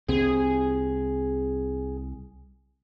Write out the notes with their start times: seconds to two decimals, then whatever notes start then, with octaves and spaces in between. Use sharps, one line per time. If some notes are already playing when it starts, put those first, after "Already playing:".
0.08 C2 C4 G#4